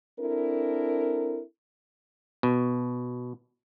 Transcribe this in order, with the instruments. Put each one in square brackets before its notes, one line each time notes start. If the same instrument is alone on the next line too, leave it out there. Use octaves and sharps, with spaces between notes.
[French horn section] C4 D4 E4 A4 A#4
[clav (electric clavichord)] B2